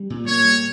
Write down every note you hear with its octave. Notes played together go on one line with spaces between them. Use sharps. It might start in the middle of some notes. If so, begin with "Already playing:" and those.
Already playing: G3
A#2
A#3 C#5
G3